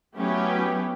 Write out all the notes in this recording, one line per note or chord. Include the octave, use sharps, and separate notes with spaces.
F#3 A3 B3 C#4 E4 G4